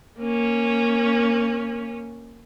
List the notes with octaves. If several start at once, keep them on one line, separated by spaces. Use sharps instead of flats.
A#3 C#4